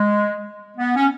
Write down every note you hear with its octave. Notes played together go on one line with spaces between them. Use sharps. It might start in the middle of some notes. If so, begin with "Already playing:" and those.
Already playing: G#3
B3
C#4